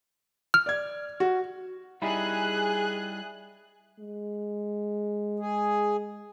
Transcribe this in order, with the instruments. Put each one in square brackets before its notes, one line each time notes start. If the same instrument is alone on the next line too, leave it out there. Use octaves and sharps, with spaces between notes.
[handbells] F6
[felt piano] D5 G#6
F#4
[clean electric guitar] G3 D#4 E4 [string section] G#4 F#6
[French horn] G#3
[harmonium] G#4